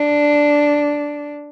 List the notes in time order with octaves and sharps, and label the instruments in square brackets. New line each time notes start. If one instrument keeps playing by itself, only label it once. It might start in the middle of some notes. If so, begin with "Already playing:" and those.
Already playing: [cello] D4